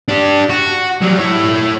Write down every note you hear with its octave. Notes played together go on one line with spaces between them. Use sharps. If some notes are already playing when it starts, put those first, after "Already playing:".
D4 G4
F#4
F#3 G3
E4 C#5